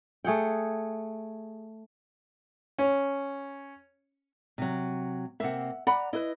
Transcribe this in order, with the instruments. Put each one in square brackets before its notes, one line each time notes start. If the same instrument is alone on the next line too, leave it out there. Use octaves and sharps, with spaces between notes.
[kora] A3 G#4 F#5 G5
[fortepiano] C#4
[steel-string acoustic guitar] C3 F#3
[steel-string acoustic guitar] C3 A#3 [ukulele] E5 F#5
[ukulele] D5 F#5 B5 [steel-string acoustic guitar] A#5
[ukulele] E4 B4 [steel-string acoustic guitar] D#5